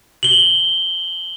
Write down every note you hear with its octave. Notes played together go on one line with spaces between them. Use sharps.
F#7 G7